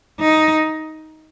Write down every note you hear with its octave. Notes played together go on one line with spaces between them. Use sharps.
D#4